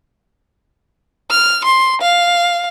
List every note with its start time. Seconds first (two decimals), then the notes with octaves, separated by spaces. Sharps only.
1.30 F6
1.64 C6
2.01 F5